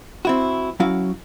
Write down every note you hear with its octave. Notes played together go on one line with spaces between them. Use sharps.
C4 E4 F#4
F#3 C#4 E4 F#4 F5